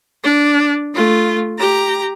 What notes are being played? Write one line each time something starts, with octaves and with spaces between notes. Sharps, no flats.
D4
A3 F4
G4 A#5